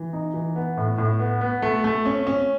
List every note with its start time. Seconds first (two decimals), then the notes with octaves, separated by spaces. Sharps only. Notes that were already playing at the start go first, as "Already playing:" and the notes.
Already playing: E3
0.13 D#4
0.34 E3
0.56 B3
0.77 A2
0.98 A2
1.20 B3
1.41 B3
1.62 A3
1.84 A3
2.05 C#4
2.27 C#4